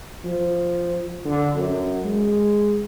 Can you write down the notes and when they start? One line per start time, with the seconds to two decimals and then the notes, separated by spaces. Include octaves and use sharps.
0.25 F3
1.25 D3
1.55 F#2
2.04 G#3